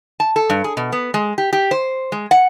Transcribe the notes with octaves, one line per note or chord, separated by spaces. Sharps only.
A5
A4
G2
G#4
B2
B3
G#3
G4
G4
C5
G#3
F#5